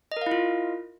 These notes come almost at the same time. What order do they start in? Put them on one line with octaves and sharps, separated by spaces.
D#5 A#4 F5 E4 F4